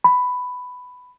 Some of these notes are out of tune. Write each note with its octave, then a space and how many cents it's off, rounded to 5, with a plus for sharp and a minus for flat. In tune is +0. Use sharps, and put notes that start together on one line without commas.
B5 +10